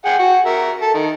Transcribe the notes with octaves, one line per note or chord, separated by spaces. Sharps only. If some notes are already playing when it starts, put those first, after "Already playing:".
G#4 F#5 G5
F#4
A#4 E5
A4
D#3